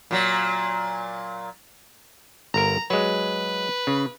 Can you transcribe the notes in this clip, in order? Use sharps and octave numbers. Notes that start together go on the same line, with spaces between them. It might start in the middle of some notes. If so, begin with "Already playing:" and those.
A#2 F#3
G1 A#4 A#5
F#3 G#3 B4
C#3